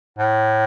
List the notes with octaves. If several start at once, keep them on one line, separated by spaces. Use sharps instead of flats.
A2